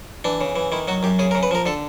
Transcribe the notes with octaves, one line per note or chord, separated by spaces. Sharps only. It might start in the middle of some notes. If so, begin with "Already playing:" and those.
E3 D4
C#3
E3
D#3 E4
F#3 F#4
F#2 G4
C#3 G#4
A#4
C#3
B4
F3 A#4
D3 A4